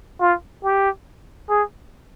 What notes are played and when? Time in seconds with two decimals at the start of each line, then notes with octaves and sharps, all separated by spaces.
0.21 F4
0.64 G4
1.50 G#4